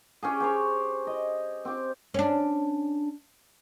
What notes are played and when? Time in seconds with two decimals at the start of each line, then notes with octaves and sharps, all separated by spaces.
0.23 C#4 G4 G#4
0.40 G4 C5 C#5
1.07 D#5
1.65 C4 G4
2.14 C#4 D4